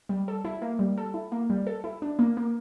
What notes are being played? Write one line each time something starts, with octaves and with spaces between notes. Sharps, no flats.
G3
A4
E4
A#3
G3
A4
E4
A#3
G3
A4
E4
D4
A#3
A#3